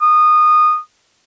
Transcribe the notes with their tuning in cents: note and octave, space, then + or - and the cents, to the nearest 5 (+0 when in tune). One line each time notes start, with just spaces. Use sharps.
D#6 -20